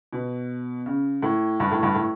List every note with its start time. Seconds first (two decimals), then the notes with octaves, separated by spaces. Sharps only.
0.13 B2
0.86 C#3
1.23 A2
1.60 G2
1.71 A2
1.83 G2
1.94 A2